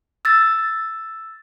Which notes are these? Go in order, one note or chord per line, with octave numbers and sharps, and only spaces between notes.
E6 A6